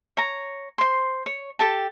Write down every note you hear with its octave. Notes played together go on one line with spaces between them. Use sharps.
C#5 A#5
C5 C6
C#5
G4 A4 G5 A5